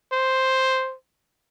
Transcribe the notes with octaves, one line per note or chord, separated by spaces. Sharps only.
C5